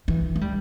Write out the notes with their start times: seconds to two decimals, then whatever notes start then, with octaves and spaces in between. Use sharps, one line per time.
0.08 E3
0.36 A3
0.41 G3